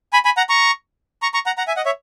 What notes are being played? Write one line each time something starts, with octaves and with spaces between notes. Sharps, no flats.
G#5 B5
G#5 B5
F#5 A#5
A#5 C#6
A#5 C#6
A#5 C#6
F#5 A#5
F#5 A#5
E5 G#5
D#5 F#5
C#5 E5